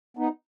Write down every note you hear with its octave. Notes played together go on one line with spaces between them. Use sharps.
B3 D#4